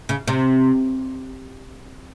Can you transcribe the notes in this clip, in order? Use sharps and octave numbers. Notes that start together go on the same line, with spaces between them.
C#3
C3